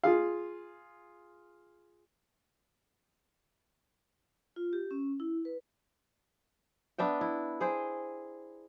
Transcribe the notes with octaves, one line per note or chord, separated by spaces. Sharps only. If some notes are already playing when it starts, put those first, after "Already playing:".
F4 G#4 F5
F4
G4
C#4
E4
B4
B3 D4 E5 G5
E4
G#4 C5 G5